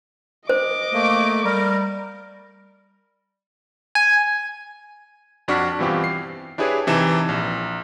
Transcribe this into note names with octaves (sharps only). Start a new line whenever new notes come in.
C5 D#5 D6
A3 A#3
G3 A#4
G#5
F2 D4 F#4 C#6 F6 B6
G2 B2 E3 C4 F4 G4
C7
D4 E4 G4 G#4 B4 C#5
C3 E3 D#4 A5 E7
A#1